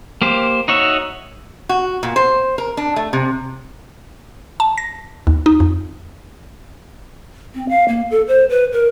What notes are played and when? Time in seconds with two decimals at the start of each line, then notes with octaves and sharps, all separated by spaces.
0.22 A#3 G4 C5
0.68 D#4 F#4 C#5 E5
1.69 F#4
2.03 A#2
2.16 C5
2.58 A#4
2.77 D4
2.96 A3
3.13 C3
4.60 A5
4.78 A#6
5.27 D#2
5.46 D#4
5.60 F2
7.55 C4
7.69 F5
7.88 A#3
8.11 A4
8.28 C5
8.49 B4
8.72 A#4